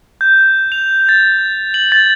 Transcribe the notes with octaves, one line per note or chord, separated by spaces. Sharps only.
G6
F7
A6
F#7
A6